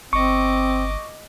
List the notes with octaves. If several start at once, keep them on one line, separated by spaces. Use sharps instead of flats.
G1 C4 D#5 C#6 D6